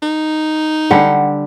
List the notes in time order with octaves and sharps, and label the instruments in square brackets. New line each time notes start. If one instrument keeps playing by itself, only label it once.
[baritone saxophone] D#4
[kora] D3 G3 G4 [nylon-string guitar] F#5